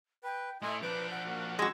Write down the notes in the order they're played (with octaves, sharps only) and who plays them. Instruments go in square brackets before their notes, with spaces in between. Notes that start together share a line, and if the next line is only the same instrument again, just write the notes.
[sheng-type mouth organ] B4 [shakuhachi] G5
[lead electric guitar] A2 A3 [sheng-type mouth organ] E4 D#5 G#5 [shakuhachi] C6
[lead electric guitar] F3 D4 [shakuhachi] B4 [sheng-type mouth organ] D6 G6
[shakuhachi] F#5
[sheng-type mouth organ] A#3 F#4
[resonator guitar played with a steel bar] G#3 F#4 [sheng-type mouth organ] G#4 A#5 E6